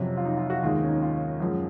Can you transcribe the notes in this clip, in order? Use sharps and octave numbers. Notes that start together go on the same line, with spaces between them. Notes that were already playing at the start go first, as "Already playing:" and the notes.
Already playing: F2 C3 F#3 C#4
F4
D#4
F4
F#4
D#2 D#3 G#3 F4
C#4
D#4
F4
F#2 F3 G#3